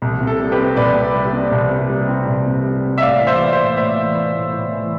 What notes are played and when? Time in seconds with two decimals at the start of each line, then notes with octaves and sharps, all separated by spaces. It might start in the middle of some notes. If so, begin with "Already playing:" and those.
0.02 C2
0.21 C3
0.27 A4
0.39 G3
0.52 G4 B4
0.58 C4
0.76 C2 B4 D5
0.95 C3
1.14 G3
1.33 C4
1.51 C2
1.71 C3
1.90 G3
2.08 C4
2.27 C2
2.46 C3
2.65 G3
2.83 C4
2.98 E5
3.02 A2 D5 F5
3.20 E3 F5
3.27 C5 E5
3.39 B3 D5
3.52 C5 E5
3.59 A2
3.77 A2 C5 E5
3.96 E3
4.15 B3
4.33 A2
4.52 A2
4.71 E3